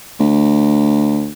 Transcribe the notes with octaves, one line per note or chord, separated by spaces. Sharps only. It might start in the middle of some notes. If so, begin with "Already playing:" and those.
D2